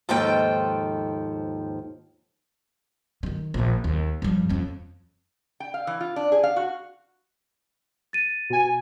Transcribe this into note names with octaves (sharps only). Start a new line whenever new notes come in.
D#2 G#2 F3 A4 G5
D3 D#3
A#1 A#2
D#2
G2 F3
F2 C#4
G5
F5
E3
F4
D4
G#4
F5
F#4
A6 D#7
B2 G#5